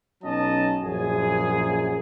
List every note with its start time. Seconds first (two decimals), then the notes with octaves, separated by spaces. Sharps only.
0.23 B1 F#3 C#4 D#5 A5
0.81 A#1 F#2 F#4 G#4 G#5